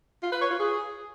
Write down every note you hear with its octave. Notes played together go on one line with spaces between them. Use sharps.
F4
B4
C#5
F4
G#4